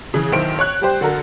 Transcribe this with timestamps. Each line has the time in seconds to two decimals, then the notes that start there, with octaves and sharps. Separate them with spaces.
0.14 C#3 E3
0.32 B1 D#3 E4 C5 D7
0.59 C#5 C#6 F#6
0.82 G3 G4 C5
1.01 D3 F#4 A4 A#4